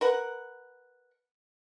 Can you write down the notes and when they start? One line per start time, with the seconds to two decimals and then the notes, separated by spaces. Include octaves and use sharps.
0.01 A#4 B4 F#5